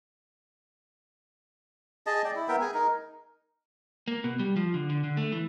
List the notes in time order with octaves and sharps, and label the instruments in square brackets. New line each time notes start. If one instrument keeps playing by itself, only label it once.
[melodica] G#4 D#5 A5
D5 G5
E4
B3 A#4 E5 G5
G#4 G#5
D#4 A#4
[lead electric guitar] A#3
B2
G3
F3
D3
D3
D3
A3
E3